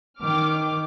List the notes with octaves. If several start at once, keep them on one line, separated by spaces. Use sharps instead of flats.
D#3 G5 D6 F6